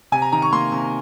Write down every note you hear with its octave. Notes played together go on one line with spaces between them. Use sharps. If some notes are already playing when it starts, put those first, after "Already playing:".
C3 G#5
A#5
D#3 A#5
C#6
A#3 C6
C3